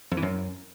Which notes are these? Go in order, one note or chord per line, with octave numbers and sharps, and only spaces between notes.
F2
E3
F#2